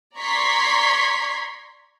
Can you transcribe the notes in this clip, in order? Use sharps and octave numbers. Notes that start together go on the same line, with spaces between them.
D5 A#5 C6 C#6 G#6 B6